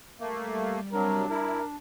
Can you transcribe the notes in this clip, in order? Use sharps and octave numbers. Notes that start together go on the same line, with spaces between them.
G3 A3 A#3
C3 F#3 D4 A#4
E4 A#4